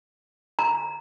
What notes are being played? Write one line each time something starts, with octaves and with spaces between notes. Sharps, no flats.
A#5